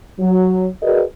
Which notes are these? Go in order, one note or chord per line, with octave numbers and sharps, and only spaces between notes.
F#3
F#4 G#4 A#4 B4 D5 D#5